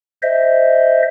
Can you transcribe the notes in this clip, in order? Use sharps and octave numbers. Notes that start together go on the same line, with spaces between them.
C5 D#5 E5